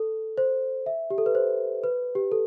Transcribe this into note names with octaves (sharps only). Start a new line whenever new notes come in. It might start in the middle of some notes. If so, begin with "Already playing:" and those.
Already playing: A4
C5
E5
G4
A4
B4
C5
B4
G4
A4